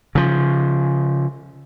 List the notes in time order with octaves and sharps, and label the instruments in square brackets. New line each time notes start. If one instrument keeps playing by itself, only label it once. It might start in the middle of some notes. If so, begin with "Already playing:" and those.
[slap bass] C#3 F3